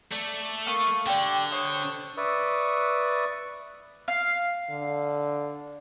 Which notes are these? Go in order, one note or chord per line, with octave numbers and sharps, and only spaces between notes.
A3 D5
A#3 C#6 D#6
D3 G4 D5
C5 C#5 D#6
B4 D5 E5 C#6 D#6
F5
D3